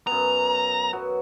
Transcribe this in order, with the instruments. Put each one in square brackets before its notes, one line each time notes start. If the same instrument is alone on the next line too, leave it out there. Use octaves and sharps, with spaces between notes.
[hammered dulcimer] F#2 B3 [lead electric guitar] A#5
[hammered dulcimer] F#3 B3 F#4